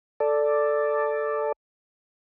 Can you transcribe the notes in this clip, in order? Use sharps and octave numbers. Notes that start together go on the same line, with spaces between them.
A4 D5